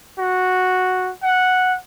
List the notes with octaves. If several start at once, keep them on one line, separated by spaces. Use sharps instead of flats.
F#4
F#5